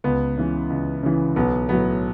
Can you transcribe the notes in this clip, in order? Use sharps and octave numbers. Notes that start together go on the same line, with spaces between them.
C#2 B3
C#3 E3
C#2
C#3 E3
B1 B3
A2 F#3 B3